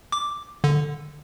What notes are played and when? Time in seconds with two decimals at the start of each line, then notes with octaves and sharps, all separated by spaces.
0.12 D6
0.64 D3